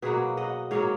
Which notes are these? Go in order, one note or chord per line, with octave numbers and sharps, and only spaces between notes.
B2 F#3 A#3 G#4 B4
D#5 F#5
G#2 F#3 A#3 C#5 F5